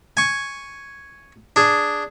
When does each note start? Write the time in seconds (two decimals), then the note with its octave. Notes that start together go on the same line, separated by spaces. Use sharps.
0.17 G#5 C#6
1.56 D4 G#4